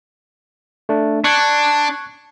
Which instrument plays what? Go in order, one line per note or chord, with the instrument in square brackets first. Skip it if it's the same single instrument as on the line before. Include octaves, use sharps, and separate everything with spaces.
[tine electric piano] A3 D4
[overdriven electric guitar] D4 [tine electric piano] C#6 F#6 G#6